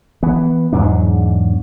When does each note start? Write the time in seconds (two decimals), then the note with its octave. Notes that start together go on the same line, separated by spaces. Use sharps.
0.23 E3 B3
0.73 E2 G#2 F#3 D4